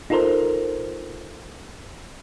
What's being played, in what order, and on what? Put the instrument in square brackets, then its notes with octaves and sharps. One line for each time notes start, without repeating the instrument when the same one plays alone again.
[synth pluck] D#4 F4 A4 A#4 C5